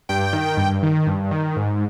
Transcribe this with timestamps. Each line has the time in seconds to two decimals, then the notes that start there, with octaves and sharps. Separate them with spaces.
0.09 G2 G5
0.33 D#3
0.57 G2
0.83 D#3
1.07 G2
1.31 D#3
1.56 G#2